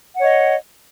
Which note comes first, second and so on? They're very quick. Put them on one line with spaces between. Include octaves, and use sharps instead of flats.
F#5 C#5 D#5